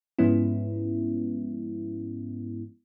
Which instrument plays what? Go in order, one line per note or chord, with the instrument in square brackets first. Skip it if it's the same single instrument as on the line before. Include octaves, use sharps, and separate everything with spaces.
[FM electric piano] G#2 F3 G#3 B3 C#4 E4